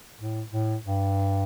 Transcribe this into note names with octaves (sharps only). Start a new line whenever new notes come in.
A2
A2
G2